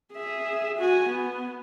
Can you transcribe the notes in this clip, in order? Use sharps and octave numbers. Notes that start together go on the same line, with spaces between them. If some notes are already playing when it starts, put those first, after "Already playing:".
G#4 E5
F#4 G#5
B3